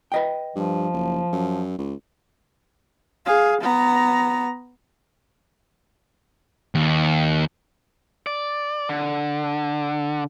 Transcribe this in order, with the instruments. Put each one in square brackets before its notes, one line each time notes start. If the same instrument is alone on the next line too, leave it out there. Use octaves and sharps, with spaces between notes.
[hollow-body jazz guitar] B4 D#5 G5
[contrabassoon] G2 [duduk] F3
[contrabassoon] F#1
F#2
C#2
[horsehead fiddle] G#4 F5
B3 A#5
[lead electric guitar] D#2
D5
D3